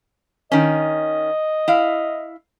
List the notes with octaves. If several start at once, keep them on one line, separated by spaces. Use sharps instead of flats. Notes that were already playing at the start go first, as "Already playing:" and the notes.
D#3 C#4 D#5
E4 F5